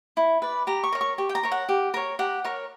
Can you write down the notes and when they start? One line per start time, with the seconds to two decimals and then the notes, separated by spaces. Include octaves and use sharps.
0.17 E4
0.42 B4 D5
0.67 G4 A#5
0.84 C#6
0.93 A#4 C#5
1.01 C#6
1.18 G4 C#6
1.29 G5
1.35 A#5
1.43 A#4 C#5
1.52 F#5
1.69 G4
1.94 A#4 C#5
2.19 G4 F#5
2.45 A#4 C#5